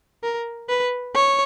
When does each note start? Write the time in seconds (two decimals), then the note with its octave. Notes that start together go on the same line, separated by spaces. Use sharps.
0.23 A#4
0.69 B4
1.14 C#5